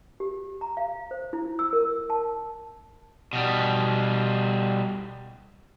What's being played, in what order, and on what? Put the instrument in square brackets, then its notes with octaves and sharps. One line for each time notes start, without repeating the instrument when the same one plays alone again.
[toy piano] G4
A#5
F5
C5
E4
E6
A#4
A5
[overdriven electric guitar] B2 G3